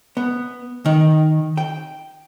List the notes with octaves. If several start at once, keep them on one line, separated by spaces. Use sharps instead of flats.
B3
D#3
G5